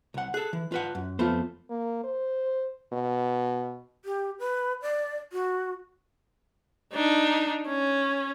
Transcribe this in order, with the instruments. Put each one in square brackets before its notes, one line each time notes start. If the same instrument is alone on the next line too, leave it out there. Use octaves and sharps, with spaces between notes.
[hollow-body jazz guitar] C2 F#5
[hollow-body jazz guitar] G#4 A4 [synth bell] F#6
[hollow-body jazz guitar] E3
F4 B4 F#5
F#2
[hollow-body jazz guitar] F2 A3 C5 [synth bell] B3 F4
[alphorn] A#3
C5
B2
[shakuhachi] G4
B4
D5
F#4
[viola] D4 D#4
C#4